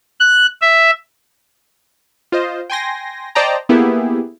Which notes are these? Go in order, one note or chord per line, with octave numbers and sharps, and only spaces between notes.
F#6
E5
F4 C5 D#5
G5 G#5 C6 A#6
C5 D5 D#5 G5 A5 A#5
A#3 B3 E4 G4 G#4